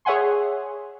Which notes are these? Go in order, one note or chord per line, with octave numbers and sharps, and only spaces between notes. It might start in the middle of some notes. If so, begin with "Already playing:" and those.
G#4 C#5 E5 F#5 G#5 C6